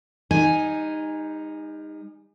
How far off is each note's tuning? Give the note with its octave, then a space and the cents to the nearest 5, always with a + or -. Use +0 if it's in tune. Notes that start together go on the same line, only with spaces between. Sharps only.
G3 +45 D#4 +0 G#5 -10